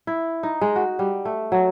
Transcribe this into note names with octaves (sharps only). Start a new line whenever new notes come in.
E4
D#4
G#3
F#4
G3
A3
F#3